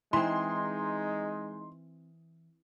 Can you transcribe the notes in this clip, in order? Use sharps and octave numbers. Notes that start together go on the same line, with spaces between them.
E3 G#3 C4 D#4 C6